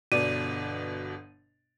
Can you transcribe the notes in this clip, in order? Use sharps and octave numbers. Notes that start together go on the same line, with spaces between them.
G1 B2 D5 D#7